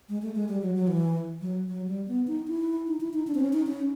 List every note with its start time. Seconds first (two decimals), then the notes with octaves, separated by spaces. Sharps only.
0.09 G#3
0.22 A3
0.35 G#3
0.48 G3
0.61 F#3
0.75 F#3
0.88 E3
1.41 F#3
1.68 F#3
1.88 G3
2.08 B3
2.27 D#4
2.48 E4
2.87 D#4
3.01 E4
3.14 D#4
3.27 D4
3.35 C4
3.40 C#4
3.53 D#4
3.67 C#4